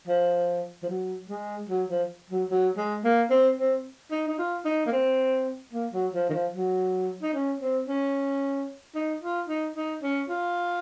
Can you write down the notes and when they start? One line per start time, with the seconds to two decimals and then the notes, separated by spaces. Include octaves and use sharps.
0.07 F3
0.83 F3
0.89 F#3
1.29 G#3
1.69 F#3
1.89 F3
2.30 F#3
2.50 F#3
2.77 G#3
3.04 A#3
3.30 C4
3.57 C4
4.11 D#4
4.28 D#4
4.39 F4
4.65 D#4
4.86 A#3
4.92 C4
5.73 A#3
5.93 F#3
6.13 F3
6.29 D#3
6.33 F3
6.54 F#3
7.22 D#4
7.34 C#4
7.60 C4
7.88 C#4
8.95 D#4
9.22 F4
9.48 D#4
9.76 D#4
10.03 C#4
10.29 F4